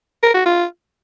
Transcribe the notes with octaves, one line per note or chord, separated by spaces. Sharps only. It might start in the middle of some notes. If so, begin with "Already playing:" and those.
A#4
F#4
F4